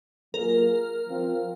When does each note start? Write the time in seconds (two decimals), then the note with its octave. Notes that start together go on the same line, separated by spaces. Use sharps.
0.34 F#3 A#3 F4 G#4 A#4
1.07 F3 C4 F4